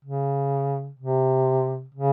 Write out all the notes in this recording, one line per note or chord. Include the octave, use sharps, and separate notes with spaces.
C#3
C3
C#3